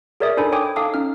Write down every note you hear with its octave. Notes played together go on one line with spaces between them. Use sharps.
G#4 A#4 C#5 D5 E5 D#6
D4 D#4 A4 C5 G#5 B5
C#5 G5 G#5 D6 D#6
D#4 A4 F5 A5 D6 D#6
C#4 D#4 F6